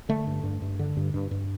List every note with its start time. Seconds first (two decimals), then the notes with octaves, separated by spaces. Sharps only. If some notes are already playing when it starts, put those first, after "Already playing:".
0.09 D3 A3
0.27 G2
0.43 G2
0.62 G2
0.79 D3
0.97 G2
1.14 G2
1.31 G2